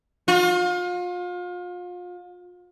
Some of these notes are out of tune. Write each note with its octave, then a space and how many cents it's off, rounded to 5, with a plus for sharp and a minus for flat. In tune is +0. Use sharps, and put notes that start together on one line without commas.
F4 +35